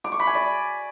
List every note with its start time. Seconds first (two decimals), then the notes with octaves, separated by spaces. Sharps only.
0.04 D6
0.12 C#6
0.20 B5
0.27 G#5
0.35 D5